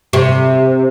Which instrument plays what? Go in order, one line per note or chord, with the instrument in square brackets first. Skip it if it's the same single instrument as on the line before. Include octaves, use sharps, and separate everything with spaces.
[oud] C3